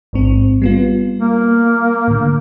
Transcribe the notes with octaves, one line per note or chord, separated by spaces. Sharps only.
A1 G#2 C4
G3 B3 F4
A#3
A2 D3